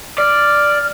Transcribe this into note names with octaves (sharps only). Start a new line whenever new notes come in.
D5 F6